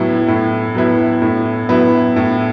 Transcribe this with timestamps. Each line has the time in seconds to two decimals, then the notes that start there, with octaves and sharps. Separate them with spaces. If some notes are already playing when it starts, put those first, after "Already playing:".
Already playing: A2 F#3 B3 E4
0.28 A2
0.75 F#3 B3 E4
1.22 A2
1.69 F#3 B3 E4
2.16 A2